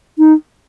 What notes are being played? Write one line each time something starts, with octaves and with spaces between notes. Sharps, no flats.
D#4